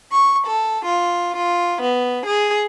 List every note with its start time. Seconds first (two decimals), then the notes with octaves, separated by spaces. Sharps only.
0.11 C#6
0.46 A4
0.85 F4
1.36 F4
1.81 B3
2.25 G#4